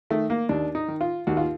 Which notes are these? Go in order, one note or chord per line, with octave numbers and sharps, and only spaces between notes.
D#3 A3
A#3
D#2 D4
D#4
D#3
F4
D#2 F#4
F4